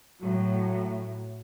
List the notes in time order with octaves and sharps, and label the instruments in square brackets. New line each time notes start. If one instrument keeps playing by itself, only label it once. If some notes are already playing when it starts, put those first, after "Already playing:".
[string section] A2 F#3